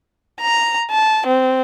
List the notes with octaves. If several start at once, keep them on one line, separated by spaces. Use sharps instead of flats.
A#5
A5
C4